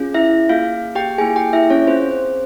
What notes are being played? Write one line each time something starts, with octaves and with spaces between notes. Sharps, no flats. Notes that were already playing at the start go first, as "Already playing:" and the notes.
Already playing: C#4 F4 G#4
E4 E5
A#3 F4 G#4 F5
G4 G5
A#3 E4 G#4 G#5
G4 G5
E4 E5
C#4 C#5
C4 F4 G#4 C5
C5